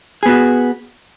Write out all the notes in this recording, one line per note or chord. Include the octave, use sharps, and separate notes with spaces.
B3 F#4 G#4